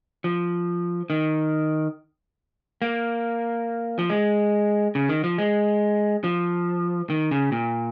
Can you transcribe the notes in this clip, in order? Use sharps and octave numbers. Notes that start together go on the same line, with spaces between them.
F3
D#3
A#3
F3
G#3
C#3
D#3
F3
G#3
F3
D#3
C#3
A#2